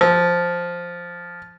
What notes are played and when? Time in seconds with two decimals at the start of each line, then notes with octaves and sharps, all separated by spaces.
0.01 F3